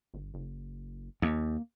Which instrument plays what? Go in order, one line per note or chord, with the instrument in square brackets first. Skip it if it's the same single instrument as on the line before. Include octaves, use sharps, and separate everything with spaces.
[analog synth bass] G1
F#1
[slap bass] D#2 [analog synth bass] A#3